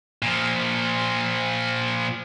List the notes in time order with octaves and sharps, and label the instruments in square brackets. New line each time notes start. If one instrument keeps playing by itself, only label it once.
[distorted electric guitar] A#2 F3